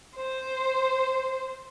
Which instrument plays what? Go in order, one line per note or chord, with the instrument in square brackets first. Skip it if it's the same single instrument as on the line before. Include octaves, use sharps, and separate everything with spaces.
[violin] C5